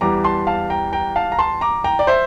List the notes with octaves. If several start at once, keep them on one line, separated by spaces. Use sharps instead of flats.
E2 E3 G3 A#5 D6
A5 C6
F5 A5
G5 A#5
G5 A#5
F5 A5
A#5
A5 C6
A#5 D6
G5 A#5
D5
C5 E5